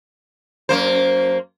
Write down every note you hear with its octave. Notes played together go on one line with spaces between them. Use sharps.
F#2 A#3 C5